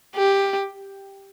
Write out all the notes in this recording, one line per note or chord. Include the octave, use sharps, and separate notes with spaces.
G4